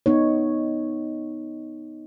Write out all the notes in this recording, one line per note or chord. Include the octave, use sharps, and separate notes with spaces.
B3 D#4 C#5